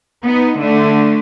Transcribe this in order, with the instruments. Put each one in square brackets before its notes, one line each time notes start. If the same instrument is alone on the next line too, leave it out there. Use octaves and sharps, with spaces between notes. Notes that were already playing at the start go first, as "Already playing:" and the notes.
[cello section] B3 D#4
D3 A3